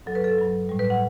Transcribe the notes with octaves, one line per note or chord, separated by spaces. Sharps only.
G2 F#3 A4
B4
A4
G2 F#3
A2 G3
B4
F#5